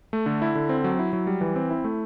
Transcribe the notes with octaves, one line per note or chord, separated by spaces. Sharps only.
A3
D3
E4
D3
C4
F#3
E4
F#3
G3
E3
C4
E4
A3